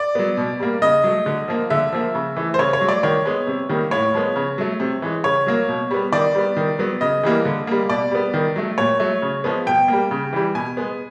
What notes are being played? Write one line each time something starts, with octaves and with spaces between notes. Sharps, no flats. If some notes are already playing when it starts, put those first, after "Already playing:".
Already playing: D5
F#3 B3
B2
G3 A#3
C#3 D#5
F#3 A3
D3
F3 A#3
D3 E5
F3 A#3
C#3
E3 A3
C5
C#3 C#5
C#5
F#3 A3
D5
D#3 C#5
G#3 B3
C3
D#3 G3 A#3
A2 C#5
F3 G#3 B3
C#3
F#3 A3
C3
E3 G#3
C#3 C#5
F#3 A#3
B2
G3 B3
D#3 D5
G3 B3
D#3
F#3 B3
C#3 D#5
E3 G3 A#3
D3
G3 A#3
B2 D5
G3 B3
D#3
F#3 A3
A#2 C#5
F#3 A3
C#3
F3 G#3 B3
B2 G5
G3 A#3
C#3
E3 G3
B2 G#5
G#3 B3